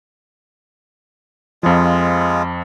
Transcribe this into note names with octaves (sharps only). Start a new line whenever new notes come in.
F2 F3 G#3 F4